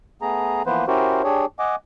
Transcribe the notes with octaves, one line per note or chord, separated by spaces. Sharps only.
A3 B3 G#4 A#5
E3 F3 A#3 B3 B4 C5
C#4 E4 F#4 G4 A#4 C5
D4 G4 G#4 C#5
D#5 F#5 G#5 D6